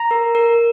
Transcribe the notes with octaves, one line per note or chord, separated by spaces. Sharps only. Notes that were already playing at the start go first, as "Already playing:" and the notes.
Already playing: A#5
A#4
A#4